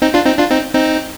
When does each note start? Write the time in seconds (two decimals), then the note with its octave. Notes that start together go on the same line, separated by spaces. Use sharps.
0.02 C4 D#4
0.14 D4 F4
0.26 C4 D#4
0.38 D4 F4
0.51 C4 D#4
0.75 C4 D#4